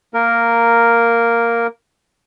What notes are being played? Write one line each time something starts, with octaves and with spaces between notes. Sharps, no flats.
A#3 A#4